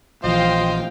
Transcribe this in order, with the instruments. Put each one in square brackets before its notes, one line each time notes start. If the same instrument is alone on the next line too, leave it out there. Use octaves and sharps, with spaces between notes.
[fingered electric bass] A#1 E3 [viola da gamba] F3 [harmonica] C5 D#5 [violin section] F5 G5